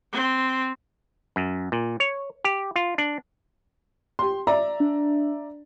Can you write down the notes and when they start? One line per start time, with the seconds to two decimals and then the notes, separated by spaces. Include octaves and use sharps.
0.12 C4
1.36 F#2
1.72 A#2
2.00 C#5
2.44 G4
2.76 F4
2.98 D4
4.19 G4 C6
4.47 D5 E5 A#5
4.80 D4